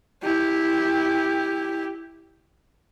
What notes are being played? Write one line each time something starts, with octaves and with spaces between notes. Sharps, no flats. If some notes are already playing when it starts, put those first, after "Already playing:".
E4 G4